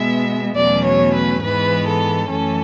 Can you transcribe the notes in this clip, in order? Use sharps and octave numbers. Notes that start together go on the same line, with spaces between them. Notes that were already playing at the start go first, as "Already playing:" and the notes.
Already playing: B2 G#3 B3 E5
E2 B2 F#3 A3 C#4 D5
C#5
B4
G#2 E3 G#3 B3 B4
A4
F#2 E3 A3 C#4 A4